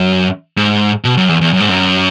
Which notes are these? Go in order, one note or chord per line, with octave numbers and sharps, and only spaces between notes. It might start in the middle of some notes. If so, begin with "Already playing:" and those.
Already playing: F#2
G#2
B2
F#2
E2
E2
F#2
G#2
F#2